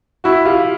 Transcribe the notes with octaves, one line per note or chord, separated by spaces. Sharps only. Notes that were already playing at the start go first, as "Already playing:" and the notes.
E4 F#4
F4 G4